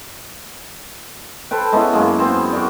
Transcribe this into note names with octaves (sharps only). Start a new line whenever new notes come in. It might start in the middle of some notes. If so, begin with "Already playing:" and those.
A4 B4 C5 G5
G#3 B3 C#4 E4
F#2 G#3 A#3
B3 C4 C5
F#4 A#4 D5